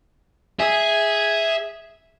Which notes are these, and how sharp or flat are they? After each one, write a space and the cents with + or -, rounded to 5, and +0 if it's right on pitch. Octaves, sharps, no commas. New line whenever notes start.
G#4 +0 E5 -5